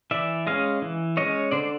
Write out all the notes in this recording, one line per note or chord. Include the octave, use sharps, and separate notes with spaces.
E3 D5 E5
G#3 C#4 D#5 F5
E3
G#3 C#4 C#5 D#5
D3 C5 D5